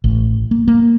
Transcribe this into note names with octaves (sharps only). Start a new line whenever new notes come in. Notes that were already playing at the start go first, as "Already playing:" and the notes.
A1
A#3
A#3